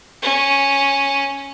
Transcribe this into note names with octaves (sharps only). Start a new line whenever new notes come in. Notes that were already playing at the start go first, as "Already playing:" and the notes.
C#4